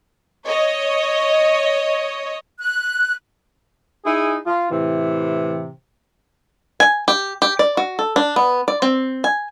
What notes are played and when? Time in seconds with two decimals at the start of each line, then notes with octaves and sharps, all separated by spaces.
0.46 C#5 D#5
2.58 F#6
4.05 D#4 E4 G#4
4.46 F4
4.70 A2 C3 E3
6.80 G#5
7.08 G4
7.42 G4
7.59 D5
7.77 F#4
7.99 A4
8.16 D4
8.36 B3
8.68 D5
8.82 C4
9.24 G#5